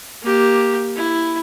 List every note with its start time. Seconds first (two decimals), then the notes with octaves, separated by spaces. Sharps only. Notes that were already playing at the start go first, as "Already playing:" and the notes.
0.23 A#3 G4
0.96 E4